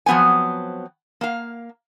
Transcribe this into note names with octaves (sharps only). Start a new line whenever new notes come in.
F3 F#3 B3 C4 G#5
A#3 F5